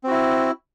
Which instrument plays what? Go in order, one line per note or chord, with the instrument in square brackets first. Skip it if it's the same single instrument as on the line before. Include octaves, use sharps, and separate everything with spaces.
[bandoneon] C4
F#4
E4